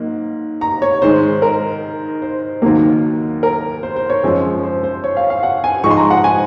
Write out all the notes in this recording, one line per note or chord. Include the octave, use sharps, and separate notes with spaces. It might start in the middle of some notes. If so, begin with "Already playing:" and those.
Already playing: G#2 F#3 A#3
A#5
C#5
G#2 D#3 G#3 C5
A#4
C5
D#2 D#3 F#3 A#3 A#4
A#4
C5
C5
C#5
F#2 F3 G#3
C5
C5
C#5
F5
F5
F#5
G#5
G#2 F3 G#3 C#6
C6
A#5
F#5
G#5